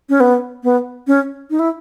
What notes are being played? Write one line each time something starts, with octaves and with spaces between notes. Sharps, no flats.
C#4
B3
B3
C#4
D#4
E4